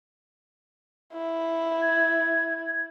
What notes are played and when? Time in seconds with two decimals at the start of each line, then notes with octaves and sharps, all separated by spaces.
1.13 E4
1.81 G#6